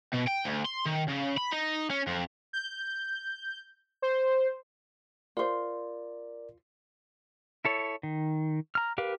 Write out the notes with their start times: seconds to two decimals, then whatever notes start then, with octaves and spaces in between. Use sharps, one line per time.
0.14 B2
0.28 G5
0.46 D2
0.65 C6
0.85 D#3
1.08 C#3
1.37 B5
1.52 D#4
1.90 C#4
2.07 F2
2.53 G6
4.02 C5
5.37 F4 A#4 C5 D5
7.65 E4 A4 C#5
8.03 D#3
8.75 A#5 F6
8.98 G4 A#4 B4 F5